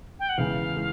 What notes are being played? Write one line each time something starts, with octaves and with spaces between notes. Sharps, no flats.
G5
F#5
E2 C#3 E3 G#3 F5
E3 G#3